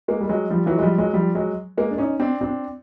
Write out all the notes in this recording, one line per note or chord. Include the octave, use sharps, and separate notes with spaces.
G#3 A#3
G3
F#3 G#3
F3 G3
E3 F#3
G#3
F3 G3
F#3 G#3
F3 G3
F#3 G#3
G#3 A#3
D4
C#4 D#4
C4 D4
C4 D4